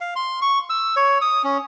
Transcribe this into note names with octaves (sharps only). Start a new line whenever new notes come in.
F5
C6
C#6
E6
C#5
D#6
C#4